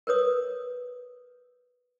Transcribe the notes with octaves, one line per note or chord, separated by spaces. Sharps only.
A#4 B4 C#5 D#6